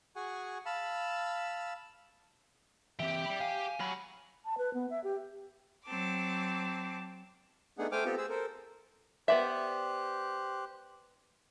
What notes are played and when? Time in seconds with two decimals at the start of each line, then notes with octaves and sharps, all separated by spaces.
0.16 F#4 G#4 F#5 G#5 C#6
0.66 F5 A5 B5 E6
3.00 E3 C4 G4 E5 G5
3.26 D5 B5
3.40 F5 G#5
3.80 F#3 B5 F6
4.45 A5
4.58 B4
4.74 B3
4.90 E5
5.04 G4
5.85 F#3 C4 A5 D6
7.78 A3 B3 D4 D#4 G#4 F#5
7.92 A3 C5 G5 G#5 D6 F6
8.05 B3 C4 F4 G4 A4
8.18 G#4 C5 E6
8.30 A4 A#4 C5
9.28 B3 G4 C5 D5 E5 F#6